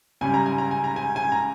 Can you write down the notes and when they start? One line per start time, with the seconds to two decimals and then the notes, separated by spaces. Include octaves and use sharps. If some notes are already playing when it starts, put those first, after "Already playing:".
0.21 C#2 C#3 G3 G#5
0.34 A#5
0.46 G#5
0.58 A#5
0.71 G#5
0.84 A#5
0.96 G#5
1.16 G#5
1.32 A#5